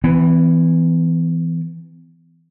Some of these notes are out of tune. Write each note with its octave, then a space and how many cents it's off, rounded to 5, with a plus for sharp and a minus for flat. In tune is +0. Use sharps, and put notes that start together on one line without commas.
E3 +0 B3 +45